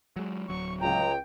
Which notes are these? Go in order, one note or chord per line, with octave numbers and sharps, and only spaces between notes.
F#3 G#3
D1 F#3 C#6
C#2 G5 A#5